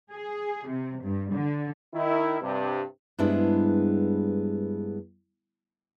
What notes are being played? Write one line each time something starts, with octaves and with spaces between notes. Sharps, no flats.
G#4
C3
G2
D3
D#3 E4
G2 C3
G2 G#3 B3 D4 E4 C5